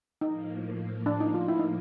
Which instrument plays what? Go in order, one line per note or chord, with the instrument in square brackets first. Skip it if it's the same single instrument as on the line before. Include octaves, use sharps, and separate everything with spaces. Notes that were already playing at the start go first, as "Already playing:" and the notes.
[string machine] A2 F3 A#3 [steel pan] D#4
[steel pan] D4
D#4
F4
E4
D#4